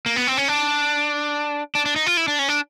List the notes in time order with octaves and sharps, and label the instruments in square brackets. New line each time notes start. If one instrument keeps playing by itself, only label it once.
[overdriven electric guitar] A#3
B3
C4
C#4
D4
D4
D4
D#4
F4
E4
D4
C#4
D4